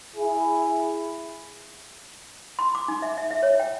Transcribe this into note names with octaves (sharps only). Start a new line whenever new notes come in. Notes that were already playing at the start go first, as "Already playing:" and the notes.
E4 G#4
C6
D6
D#4
E5
E5
E5
C#5
G5